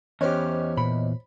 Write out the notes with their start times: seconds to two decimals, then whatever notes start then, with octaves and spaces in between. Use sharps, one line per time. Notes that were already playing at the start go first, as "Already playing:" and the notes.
0.21 E2 C#4 G4 C5 C#5 D#5
0.77 A#2 B5